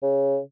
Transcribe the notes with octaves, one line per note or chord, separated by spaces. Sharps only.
C#3